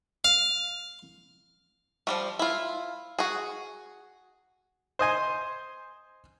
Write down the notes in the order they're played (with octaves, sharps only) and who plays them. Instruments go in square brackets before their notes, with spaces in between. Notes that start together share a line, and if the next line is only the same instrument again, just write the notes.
[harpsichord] F5
[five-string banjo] F3 G3 A3
E4 F4
F#4 G#4
[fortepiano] C5 D#5 G#5 C6